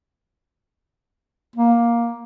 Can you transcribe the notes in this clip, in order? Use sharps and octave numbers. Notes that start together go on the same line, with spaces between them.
A#3